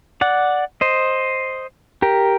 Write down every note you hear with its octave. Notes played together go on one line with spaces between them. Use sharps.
D5 F#5
C5 D#5
G4 A#4